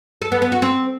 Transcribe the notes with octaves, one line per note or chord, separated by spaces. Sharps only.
A4
B3
B3
F#4
C4